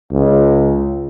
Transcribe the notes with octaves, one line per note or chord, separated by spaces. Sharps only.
C#2